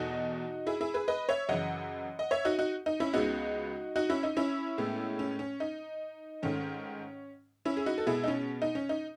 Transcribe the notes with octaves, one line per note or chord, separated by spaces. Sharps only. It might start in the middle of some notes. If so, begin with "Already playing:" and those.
Already playing: E2 B2 A3 D#4 F#4
E4 G#4
E4 G#4
G#4 B4
B4 D#5
C#5 E5
F#2 C#3 E3 D#5 F#5
D#5
C#5 E5
D#4 F#4
D#4 F#4
D#4
C#4 E4
C#2 C#3 G#3 B3 D#4 F#4
D#4 F#4
C#4 E4
D#4
C#4 E4
A2 G#3 B3
C#4
C#4
D#4
G#2 D#3 A3 C#4
C#4 E4
G#4
D#4 F#4
A4
B2 G#3 B3 E4 G#4
D#4
C#4
D#4
C#4
D#4